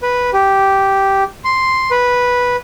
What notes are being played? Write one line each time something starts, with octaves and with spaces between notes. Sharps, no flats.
B4
G4
C6
B4